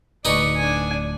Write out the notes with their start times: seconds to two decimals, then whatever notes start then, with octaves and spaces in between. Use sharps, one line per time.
0.25 D1 D2 D#4 G#4 B4 D5 C#6
0.57 D4 G#5